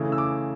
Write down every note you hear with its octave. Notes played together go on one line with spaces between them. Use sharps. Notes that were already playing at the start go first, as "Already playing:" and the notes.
Already playing: C#3 E3 A3
E6
D6